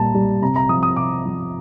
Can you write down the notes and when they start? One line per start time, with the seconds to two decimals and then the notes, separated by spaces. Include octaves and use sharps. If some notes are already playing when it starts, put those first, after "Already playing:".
Already playing: A#2 G3 A5 A#5
0.15 G3
0.42 C3 A#5
0.56 A#5
0.69 F3 D#6
0.83 D#6
0.96 C3 D6
1.25 F3